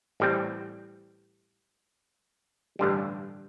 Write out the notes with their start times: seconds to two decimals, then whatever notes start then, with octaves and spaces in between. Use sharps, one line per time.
0.20 A1 A2 G3 C4
2.79 A1 G2 D3 G3